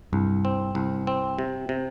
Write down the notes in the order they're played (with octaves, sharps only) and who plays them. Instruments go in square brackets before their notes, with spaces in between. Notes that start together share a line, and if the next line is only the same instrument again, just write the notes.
[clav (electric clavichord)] C2 [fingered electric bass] G2
[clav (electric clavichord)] C4
C2
C4
C3
C3